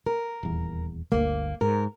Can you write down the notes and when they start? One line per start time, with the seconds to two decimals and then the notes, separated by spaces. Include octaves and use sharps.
0.06 A#4
0.43 D#1 E2
1.12 G1 D2 A#3
1.61 G#2 A#4